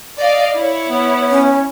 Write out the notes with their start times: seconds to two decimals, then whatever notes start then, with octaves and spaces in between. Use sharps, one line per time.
0.18 D5 D#5 F5
0.55 E4 C#5
0.88 B3
1.31 C#4